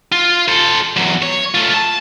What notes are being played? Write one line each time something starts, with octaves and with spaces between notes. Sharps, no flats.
F4
A4 C5
E2 F#3
C#5
A3 F4
A5